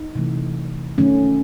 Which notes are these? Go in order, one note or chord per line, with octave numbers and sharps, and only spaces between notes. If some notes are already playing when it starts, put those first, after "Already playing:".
Already playing: D#4
C3 E3 A3
D#3 F#3 A3 C#4